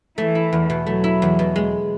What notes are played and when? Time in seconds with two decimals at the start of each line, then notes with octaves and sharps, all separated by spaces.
0.18 E3 A3
0.35 E4
0.53 E2
0.70 B2
0.86 F#3 A3
1.04 E4
1.22 E2
1.39 B2
1.56 G#3